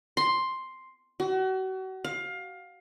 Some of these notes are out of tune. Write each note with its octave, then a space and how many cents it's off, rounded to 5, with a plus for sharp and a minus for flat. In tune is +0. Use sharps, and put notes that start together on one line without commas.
C6 +5
F#4 +35
F5 +20